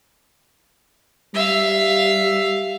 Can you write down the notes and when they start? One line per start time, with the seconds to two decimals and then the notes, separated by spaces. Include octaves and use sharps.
1.34 G3 E5 F5